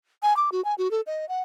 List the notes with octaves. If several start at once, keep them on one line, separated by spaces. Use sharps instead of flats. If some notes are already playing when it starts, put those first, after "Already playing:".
G#5
D6
F#4
G#5
F#4
A4
D#5
F#5